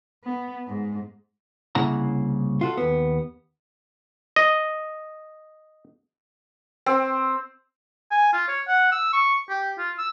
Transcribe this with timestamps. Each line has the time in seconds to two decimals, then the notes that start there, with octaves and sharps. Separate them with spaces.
0.24 B3
0.67 G#2
1.75 C2 C#3 A#3 E4 F#5 A#5
2.61 F4 F#4 A4
2.77 D#2 B3
4.36 D#5
6.86 C4
8.11 G#5
8.33 F4
8.48 C#5
8.68 F#5
8.92 E6
9.13 C#6
9.49 G4
9.78 F4
9.98 E6